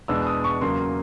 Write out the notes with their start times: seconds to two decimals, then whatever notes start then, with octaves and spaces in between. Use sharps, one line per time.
0.08 E2 B2 G#3 B3 D4 E6
0.27 D#6
0.44 C#6
0.61 E2 C#3 F#3 A#3 C6